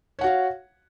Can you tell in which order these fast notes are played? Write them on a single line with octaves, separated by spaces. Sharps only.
C#5 F#5 F#4 F5